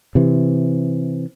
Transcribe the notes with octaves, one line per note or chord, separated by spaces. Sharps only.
C3 E3